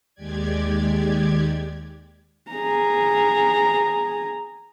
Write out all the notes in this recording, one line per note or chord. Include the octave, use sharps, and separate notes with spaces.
D#2 G#3 G4 D5 G#6
G#4 A#5